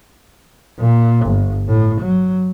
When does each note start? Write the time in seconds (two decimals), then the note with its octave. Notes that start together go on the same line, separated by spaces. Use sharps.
0.79 A#2
1.26 G1
1.68 A2
2.01 F#3